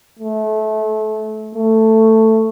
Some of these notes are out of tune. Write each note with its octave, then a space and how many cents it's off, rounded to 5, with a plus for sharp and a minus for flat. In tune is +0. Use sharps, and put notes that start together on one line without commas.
A3 -25
A3 +10